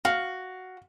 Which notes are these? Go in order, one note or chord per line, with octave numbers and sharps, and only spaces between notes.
F#4 F5